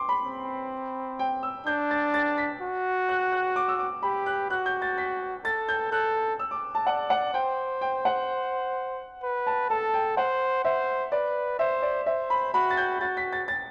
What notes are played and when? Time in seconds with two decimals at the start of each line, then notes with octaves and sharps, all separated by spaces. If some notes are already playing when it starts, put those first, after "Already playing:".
Already playing: C6 D6
0.09 B5
0.25 C4
1.19 G5
1.43 E6
1.67 D4 G6
1.91 A6
2.14 A6
2.38 B6
2.61 F#4
3.09 F#6
3.32 F#6
3.56 D6
3.68 E6
3.79 D6
4.03 G4 B5
4.26 F#6
4.50 F#4 F#6
4.66 G6
4.82 A6
4.98 B6
5.45 A4 A6
5.68 G6
5.92 A4 F#6
6.39 E6
6.51 D6
6.75 A5
6.86 D5 F#5
7.10 F#5
7.34 C5 G5
7.81 G5
8.05 F#5
9.23 B4
9.47 A5
9.70 A4 A5
9.94 G5
10.17 C5 F#5
10.64 C5 E5
11.12 B4 D5
11.59 C5 E5
11.82 D5
12.06 C5 E5
12.30 B5
12.54 F#4 B5
12.70 A6
12.77 G6
13.01 F#4 A6
13.17 B6
13.33 A6
13.48 A6